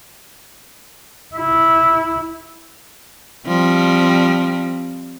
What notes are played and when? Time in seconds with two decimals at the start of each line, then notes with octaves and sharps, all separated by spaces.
1.35 E4
3.47 F3 G3 C4